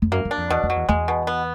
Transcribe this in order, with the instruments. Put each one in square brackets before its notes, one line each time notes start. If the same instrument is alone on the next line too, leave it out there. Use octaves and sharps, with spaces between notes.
[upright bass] F2
[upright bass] F#2 [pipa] A#3
[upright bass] F#2
[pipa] D4
[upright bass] F2
[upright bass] E2 [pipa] B2
[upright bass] F2
[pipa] F#3
[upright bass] E2
[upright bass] E2 [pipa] G#3
[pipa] B2
B3